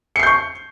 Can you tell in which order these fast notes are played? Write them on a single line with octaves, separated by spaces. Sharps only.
C#7 C7 G6 C#6